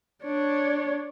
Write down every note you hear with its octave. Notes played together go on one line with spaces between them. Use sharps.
D4 C#5